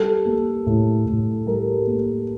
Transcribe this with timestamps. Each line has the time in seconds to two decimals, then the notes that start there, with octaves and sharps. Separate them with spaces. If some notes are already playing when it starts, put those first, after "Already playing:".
Already playing: G3 A4
0.26 A#3
0.67 A2
1.06 A2
1.47 G3 A#4
1.87 A#3